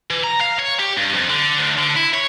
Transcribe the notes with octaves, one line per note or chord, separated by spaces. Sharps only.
E3
A#5
F5
C#5
G4
G2
F2
D3
D2
D3
E4
C#5